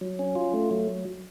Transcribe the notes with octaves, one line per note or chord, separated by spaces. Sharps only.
F#3
C#4
F4
A3
F#3